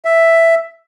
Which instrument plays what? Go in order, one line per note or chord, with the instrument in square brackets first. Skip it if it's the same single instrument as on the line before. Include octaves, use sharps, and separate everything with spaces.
[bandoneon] E5